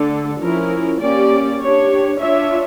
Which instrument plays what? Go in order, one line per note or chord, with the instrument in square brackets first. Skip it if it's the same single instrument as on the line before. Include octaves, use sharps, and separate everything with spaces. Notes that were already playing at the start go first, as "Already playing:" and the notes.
Already playing: [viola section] D3 A3 D4 A4
F3 C#4 E4 A#4
A#3 C#4 G4 D5
D4 G4 C#5
D4 F4 C#5 E5